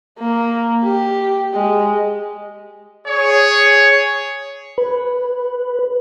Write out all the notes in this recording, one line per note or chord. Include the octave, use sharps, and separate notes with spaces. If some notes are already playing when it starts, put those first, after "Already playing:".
A#3
G4
G#3
G#4 C#5
B4